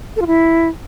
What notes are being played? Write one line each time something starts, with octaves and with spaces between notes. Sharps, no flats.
A4
F4
E4